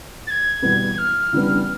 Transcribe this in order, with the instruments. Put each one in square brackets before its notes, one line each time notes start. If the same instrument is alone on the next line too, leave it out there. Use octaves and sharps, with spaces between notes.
[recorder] A6
G#6
[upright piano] E2 B2 G3 B3
[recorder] F6
[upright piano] C#3 E3 G3 B3 D4